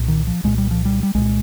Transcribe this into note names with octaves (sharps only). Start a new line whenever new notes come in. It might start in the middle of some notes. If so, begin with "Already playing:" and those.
Already playing: C2 A#2
D#3
F3
C2 A#2 G#3
G3
F3
G3
G3
C2 A#2 G#3